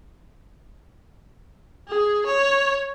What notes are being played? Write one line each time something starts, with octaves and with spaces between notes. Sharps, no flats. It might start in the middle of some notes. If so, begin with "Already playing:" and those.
G#4
C#5